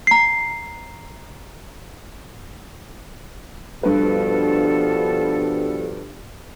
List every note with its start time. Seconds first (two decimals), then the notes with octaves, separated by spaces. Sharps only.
0.07 A#5 C7
3.83 G2 B2 F3 G3 A4 B4